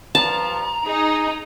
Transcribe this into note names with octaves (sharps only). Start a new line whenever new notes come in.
G2 F3 A5 A#5
D#4 G#4